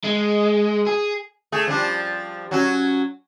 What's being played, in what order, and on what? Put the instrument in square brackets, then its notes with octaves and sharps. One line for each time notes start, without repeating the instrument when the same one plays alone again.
[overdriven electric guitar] G#3
G#4
[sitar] A3 G#4
F3 G3 D4
F#3 C#4 F#4